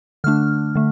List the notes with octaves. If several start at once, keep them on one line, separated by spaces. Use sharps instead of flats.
D3 A3 D4 F6
D3 A3